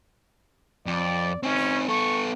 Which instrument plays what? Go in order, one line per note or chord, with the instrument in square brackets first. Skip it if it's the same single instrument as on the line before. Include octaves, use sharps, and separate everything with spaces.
[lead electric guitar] F2 [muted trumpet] D5
[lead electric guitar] C4 D#4 [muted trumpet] C#4
[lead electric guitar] B3 A4 [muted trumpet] C#6